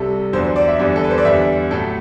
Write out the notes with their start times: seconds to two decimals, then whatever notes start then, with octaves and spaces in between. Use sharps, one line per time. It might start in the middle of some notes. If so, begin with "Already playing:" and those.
Already playing: C2 C3 G3 A4
0.33 E2 D3 F#3 C5
0.44 C5
0.56 D5
0.68 E5
0.79 E2 D3 G3
0.96 A4
1.04 B4
1.10 C5
1.18 D5
1.25 E2 D3 G3 E5
1.71 A2 F#3 A3 A4